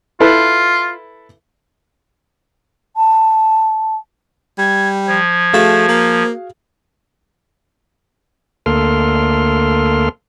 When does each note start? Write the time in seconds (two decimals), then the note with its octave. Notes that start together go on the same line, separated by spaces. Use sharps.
0.20 E4 F4 A4 B4
2.97 A5
4.58 G3 G#6
5.07 F3 G#6
5.53 A3 F#4 G#4 F5
5.88 A#3
8.66 D2 A#3 A4 C6 F6